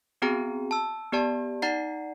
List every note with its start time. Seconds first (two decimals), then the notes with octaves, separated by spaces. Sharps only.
0.22 B3 C4 F#4 G#4 G5 A#5
0.71 A5 E6
1.12 B3 G4 D5 A5
1.62 D#4 D5 F#5 A#5 C7